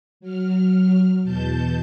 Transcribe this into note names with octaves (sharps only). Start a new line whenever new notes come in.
F#3 F6
E2 B2 A5 G6